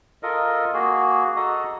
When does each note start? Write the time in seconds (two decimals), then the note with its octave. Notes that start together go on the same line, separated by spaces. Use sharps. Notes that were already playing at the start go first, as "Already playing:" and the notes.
0.23 F4 A4 A#4 D#5
0.74 A#3 F#4 G#4
1.36 F#4 A4 D#5 A#5